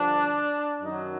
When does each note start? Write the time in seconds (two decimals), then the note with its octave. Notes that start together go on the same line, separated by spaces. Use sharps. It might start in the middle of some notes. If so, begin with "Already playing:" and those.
Already playing: G2 D3 F3 D4
0.81 F#2 D#3 F#3 D#4